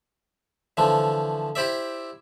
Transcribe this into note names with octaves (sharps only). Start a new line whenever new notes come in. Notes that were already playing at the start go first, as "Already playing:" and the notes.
D3 E3 F3 A3
E4 G4 C5 D5 E5